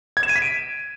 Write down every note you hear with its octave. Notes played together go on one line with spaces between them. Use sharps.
G#6
E7
D#7
B6
D7